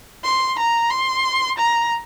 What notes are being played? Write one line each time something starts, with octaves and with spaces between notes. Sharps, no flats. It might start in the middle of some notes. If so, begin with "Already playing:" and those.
C6
A#5
C6
A#5